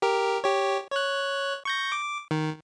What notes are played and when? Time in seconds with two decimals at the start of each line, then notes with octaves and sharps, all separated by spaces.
0.02 G4 A#4
0.44 G4 C#5
0.92 C#5 F#6
1.65 C#6 G6 A#6
1.92 D6
2.31 D#3